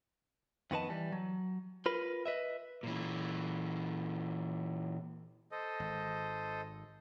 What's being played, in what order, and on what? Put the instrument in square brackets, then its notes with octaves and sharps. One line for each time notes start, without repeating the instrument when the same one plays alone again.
[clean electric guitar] F2 D#3 B3 B4 D#5 A5
E3 G3
F#3
F4 A#4 B4 B5
B4 D#5 E5
[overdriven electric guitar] A#2 E3
[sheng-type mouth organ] A4 C5 D#5
[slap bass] G#1